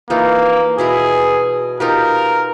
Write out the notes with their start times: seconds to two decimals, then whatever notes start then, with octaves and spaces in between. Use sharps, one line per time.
0.10 E3 A#3 D#4 F4
0.78 B2 E4 G#4 A#5
1.80 D#4 F4 G4 A#4